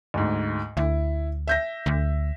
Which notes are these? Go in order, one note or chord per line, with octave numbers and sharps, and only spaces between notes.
D2 G#2
D2 E4
E5 G6 A#6
D2